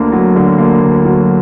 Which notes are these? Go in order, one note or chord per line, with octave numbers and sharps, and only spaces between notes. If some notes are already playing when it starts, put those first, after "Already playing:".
Already playing: D2 D3 A#3
F#3
D3
A#3
D2
F#3